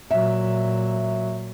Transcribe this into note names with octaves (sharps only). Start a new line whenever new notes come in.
A#2 F#3 E5